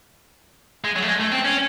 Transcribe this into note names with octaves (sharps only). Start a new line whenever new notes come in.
G#3
F#3
A3
G#3
A3
C4
C#4